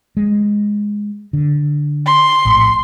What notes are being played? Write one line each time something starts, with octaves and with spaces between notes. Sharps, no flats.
G#3
D3
C6
A#1 A2